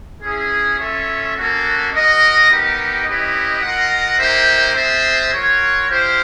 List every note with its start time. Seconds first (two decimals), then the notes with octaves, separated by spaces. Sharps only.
0.21 C#4 E4 G#4
0.78 C#4 F4 A4 C#5 E5
1.35 A#3 C#4 F#4 A4
1.91 F#4 A#4 D#5
2.48 B3 D#4 G4 A#4
3.04 C#4 E4 G4 B4 D#5
3.61 F4 A#4 D#5 F#5
4.18 A#3 D#4 G4 C5 E5
4.75 C4 F4 G#4 C5 E5
5.32 F4 A#4 C#5 F#5
5.88 E4 G4 C5 F5